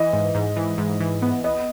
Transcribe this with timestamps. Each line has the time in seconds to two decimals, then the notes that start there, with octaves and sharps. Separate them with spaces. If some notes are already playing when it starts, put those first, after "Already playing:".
Already playing: E3 D#5
0.13 G#2
0.35 G#2
0.57 E3
0.78 G#2
1.00 E3
1.22 B3
1.44 B3 D#5